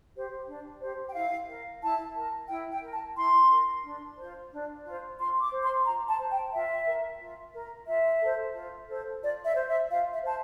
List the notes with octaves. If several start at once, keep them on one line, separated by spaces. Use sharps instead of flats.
G4 C5
D4
G4 C5
G5
E4 F5
A#4
E4 A5
A#4
E4 G5
G5
A#4
A5
E4 C6
A#4
D4
F4 C5
D4
F4 C5
F4 C6
D6
C5
C6
F4 A#5
A5
C5
G5
F4 E5
A#4
F4
A#4
F4 E5
A4 C5
F4
A4 C5
F4 D5
E5
C5
E5
F4 F5
E5
C5 A5